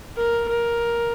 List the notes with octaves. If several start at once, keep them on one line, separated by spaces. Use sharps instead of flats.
A#4
A#4